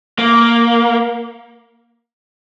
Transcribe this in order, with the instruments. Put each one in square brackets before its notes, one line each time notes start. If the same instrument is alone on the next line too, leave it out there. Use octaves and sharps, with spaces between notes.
[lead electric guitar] A#3